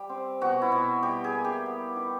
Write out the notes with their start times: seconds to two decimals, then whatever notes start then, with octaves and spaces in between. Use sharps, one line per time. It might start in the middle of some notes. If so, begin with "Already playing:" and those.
Already playing: G3 G4
0.09 C4
0.41 B2 F#4
0.62 E4
0.72 B2
1.03 G3 G4
1.24 G#4
1.35 A#3
1.44 G4
1.66 B3
1.96 D#3